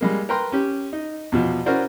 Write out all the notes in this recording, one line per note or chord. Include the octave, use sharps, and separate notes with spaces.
G3 G#3 A#3
A#4 B4 G5 A#5 C6
C#4 G4
D#4
E2 B2 F3
C#4 E4 F#4 A#4 C5 D5